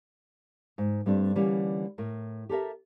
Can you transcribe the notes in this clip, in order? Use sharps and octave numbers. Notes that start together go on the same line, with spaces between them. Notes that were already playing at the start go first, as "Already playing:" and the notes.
G#2
G2 G3 A3 C4 D4
D3 E3 G3 A#3 C#4
A2 A#4
G4 A4 A#4 E5